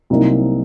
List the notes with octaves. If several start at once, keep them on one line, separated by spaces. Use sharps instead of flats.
C2 C3 F#3 A#3 D#4